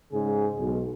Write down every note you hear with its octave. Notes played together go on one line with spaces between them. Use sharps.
G#2 C#3 G#4
B1